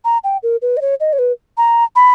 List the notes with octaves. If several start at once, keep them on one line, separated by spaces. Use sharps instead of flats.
A#5
G5
A#4
B4
D#5
C#5
D#5
C#5
B4
A#5
B5